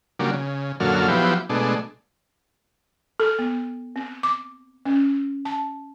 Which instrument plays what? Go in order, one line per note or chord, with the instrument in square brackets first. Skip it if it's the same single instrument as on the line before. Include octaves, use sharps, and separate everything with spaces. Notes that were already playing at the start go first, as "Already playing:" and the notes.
[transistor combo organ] C#3 F#3 G3 A#3 D4
C#3
F#2 A#2 D3 F#3 A4 F6
F3 F#3 B3 E4 G4
B2 G#3 A3 D4
[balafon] A4
B3
C4
D6
C#4
A5